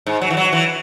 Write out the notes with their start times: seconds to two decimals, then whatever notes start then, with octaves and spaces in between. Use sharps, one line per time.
0.06 G#2
0.22 F#3
0.30 E3
0.37 F#3
0.52 E3